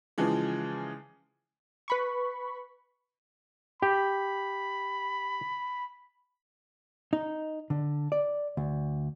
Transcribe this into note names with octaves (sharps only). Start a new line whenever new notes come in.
C#3 E3 F3 G#3
B4 B5 C#6
G4 B5
D#4
D3
D5
D2